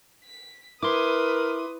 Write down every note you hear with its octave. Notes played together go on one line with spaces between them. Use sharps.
B6
E4 A#4 B4 C6 D6 D#6